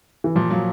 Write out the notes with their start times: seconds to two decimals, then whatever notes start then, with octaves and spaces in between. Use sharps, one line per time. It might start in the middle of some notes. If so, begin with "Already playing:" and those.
0.24 E3
0.35 A#2 F3
0.50 F3 F#3